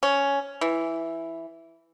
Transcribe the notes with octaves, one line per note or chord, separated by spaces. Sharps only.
C#4
E3